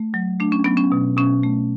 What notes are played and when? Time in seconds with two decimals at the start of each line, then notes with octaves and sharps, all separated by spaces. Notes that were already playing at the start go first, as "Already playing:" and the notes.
Already playing: A3
0.14 F#3
0.40 A3 D4
0.52 C#4
0.64 F#3 B3
0.77 C#4
0.92 B2
1.17 B2 C#4
1.43 A3